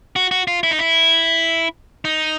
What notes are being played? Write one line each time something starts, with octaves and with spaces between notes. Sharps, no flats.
F#4
F#4
F4
E4
D#4
E4
D#4